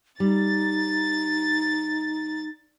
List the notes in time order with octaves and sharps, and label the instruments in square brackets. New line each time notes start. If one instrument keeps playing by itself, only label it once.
[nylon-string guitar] G3 [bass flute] D#4 [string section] A6